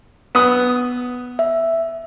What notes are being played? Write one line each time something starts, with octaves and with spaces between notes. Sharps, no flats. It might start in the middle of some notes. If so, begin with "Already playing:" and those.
B3 D#6
E5